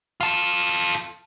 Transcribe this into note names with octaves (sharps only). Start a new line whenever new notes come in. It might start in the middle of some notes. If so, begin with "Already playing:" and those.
F4 A4